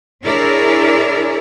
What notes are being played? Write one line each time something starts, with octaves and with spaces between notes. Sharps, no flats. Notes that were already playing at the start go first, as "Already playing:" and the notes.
D4 E4 G#4 A#4 C#5 D5